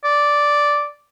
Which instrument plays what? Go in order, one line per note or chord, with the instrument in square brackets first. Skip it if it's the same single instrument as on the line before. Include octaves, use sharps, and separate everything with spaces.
[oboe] D5